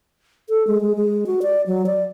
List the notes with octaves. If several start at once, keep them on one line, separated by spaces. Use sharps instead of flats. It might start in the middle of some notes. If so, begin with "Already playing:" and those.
A4
G#3
G#3
G#3
F#4
D5
F#3
D5